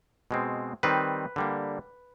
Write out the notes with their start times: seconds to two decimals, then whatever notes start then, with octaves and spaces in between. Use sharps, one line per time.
0.31 B2 G#3 C4
0.83 D#3 G3 C4 D#4 B4
1.36 D3 G3 A#3